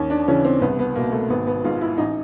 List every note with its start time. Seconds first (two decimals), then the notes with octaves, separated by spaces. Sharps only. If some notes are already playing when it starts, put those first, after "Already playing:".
Already playing: D#2 C#4
0.10 D4
0.28 C#3 E3 C#4
0.45 C4
0.61 C2 B3
0.79 B3
0.95 B2 A#3
1.12 A3
1.30 G#1 B3
1.47 B3
1.64 G#2 D#3 F4
1.81 E4
1.98 A1 D#4